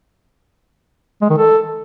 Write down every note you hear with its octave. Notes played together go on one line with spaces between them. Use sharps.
G#3
D#3
A4